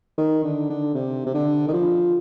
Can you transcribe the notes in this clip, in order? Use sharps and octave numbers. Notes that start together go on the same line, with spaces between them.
D#3
D3
D3
C3
C3
D3
D#3
F3